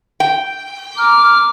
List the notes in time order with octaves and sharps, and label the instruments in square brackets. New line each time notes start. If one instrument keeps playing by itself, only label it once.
[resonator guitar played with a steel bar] G5
[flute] A#5 [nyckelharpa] D6 [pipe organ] F6